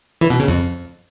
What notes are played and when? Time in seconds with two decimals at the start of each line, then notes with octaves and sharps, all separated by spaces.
0.21 E3
0.30 B2
0.39 C#3
0.48 F2